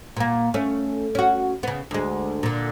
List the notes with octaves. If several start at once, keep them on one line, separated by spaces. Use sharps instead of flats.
A#2 A#3
A3 C#4
C#4 F#4
C#3 B3
D2 G#3
A#2 D3